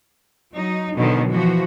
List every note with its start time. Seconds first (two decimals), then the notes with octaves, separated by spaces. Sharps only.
0.53 F#3 D#4
0.96 B2 D3 D#3 F#3
1.31 E3 F3 F#4